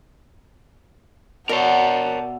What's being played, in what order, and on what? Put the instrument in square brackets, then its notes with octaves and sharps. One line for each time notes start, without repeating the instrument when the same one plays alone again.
[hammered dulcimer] B2 E5 [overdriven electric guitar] A#4 C#5 [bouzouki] D5 [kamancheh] F#5 A5